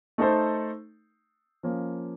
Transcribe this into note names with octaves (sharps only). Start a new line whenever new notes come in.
A3 D#4 A4 C5
F3 A#3 C#4